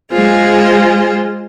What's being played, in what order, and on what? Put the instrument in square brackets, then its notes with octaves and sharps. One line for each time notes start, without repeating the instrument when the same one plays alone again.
[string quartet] G#3 F4 G#4 C5